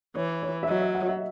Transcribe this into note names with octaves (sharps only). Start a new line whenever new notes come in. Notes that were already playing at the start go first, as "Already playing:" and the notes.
E3 C#5
C#5
E5
F#3 D#5
E5
F#5
E5